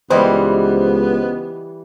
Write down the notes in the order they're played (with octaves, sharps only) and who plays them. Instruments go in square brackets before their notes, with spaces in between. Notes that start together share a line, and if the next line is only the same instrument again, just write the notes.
[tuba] C#2 [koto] E3 G3 G4 [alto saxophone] B3 [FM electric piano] C5 D#5